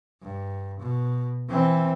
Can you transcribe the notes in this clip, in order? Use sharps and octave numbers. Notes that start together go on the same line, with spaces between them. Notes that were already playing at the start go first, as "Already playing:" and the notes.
G2
B2
E3 C4